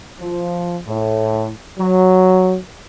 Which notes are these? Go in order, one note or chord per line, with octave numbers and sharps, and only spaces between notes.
F3
A2
F#3